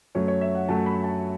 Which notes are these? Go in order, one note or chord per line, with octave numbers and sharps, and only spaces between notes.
F#2 F#3 A3 C#5
C#5
E5
F#5
F#2 F#3 A3 A5
B5
A5